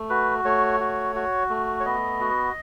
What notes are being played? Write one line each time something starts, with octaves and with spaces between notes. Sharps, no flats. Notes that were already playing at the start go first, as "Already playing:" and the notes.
Already playing: A3
F#4 B4
A3 C#5
F#4
F#4
A3
C#5
B3 D#5
F#4